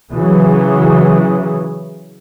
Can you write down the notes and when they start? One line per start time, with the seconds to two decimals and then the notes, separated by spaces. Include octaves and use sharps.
0.12 C#3 E3 F#3